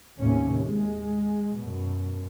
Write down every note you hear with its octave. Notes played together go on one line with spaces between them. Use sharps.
D#2 A2 C3 C#4
G#3
F#2 B2